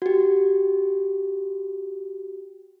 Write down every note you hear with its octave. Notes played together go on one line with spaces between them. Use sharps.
F#4 G4